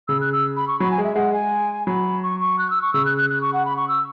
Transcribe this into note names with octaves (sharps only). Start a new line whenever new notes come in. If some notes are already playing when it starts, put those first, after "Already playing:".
C#3 E6
F#6
E6
B5
C#6
F#3 B5
G#5
G#3
E5
G#3 F#5
G#5
F#3 B5
C#6
C#6
F#6
E6
C#6
C#3 E6
F#6
F#6
F#6
C#6
F#5
B5
C#6
E6